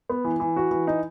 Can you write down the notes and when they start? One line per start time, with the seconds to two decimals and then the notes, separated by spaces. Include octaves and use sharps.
0.10 B3
0.24 E3
0.40 E3
0.56 F#4
0.71 E3
0.87 D#4